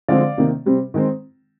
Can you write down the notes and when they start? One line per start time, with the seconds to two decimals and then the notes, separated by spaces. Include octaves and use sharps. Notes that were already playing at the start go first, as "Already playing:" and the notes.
0.08 D3 F3 G#3 C4 D5 F5
0.37 C3 D#3 A#3
0.66 C3 G3 C4
0.94 D#3 G#3 C4